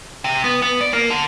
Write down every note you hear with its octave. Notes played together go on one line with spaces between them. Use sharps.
C3
B3
B3
D5
A#3
D3